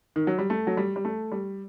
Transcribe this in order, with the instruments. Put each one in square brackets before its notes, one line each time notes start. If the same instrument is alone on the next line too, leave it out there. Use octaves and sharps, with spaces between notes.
[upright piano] D#3
F#3
G3
A3
F#3
G3
G3
A3
G3